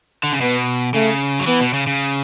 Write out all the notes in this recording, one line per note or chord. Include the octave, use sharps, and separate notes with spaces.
D3
C#3
B2 B3
C#3 A3
F#3
E3 B3
B2
C#3
C#3